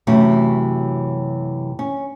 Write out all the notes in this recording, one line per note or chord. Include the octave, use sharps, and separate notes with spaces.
F#2 C3 E3 A3 F#4
C#4